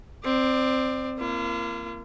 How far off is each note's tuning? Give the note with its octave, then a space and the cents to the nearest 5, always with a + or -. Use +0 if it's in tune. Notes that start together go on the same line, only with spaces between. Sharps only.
C4 +0 D5 +25
A#3 +0 F4 -45